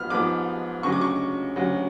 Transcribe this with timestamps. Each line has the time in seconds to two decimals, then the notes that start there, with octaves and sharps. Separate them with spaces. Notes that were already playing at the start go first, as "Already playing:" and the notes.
Already playing: G#2 F3 B3 F6
0.10 G#2 F3 B3 D6
0.83 D2 C#3 F#3 C#6
0.92 D6
1.01 C#6
1.56 D2 C#3 F#3